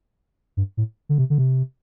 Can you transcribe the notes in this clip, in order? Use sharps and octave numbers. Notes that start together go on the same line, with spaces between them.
G2
A2
D3
C3
D3
C3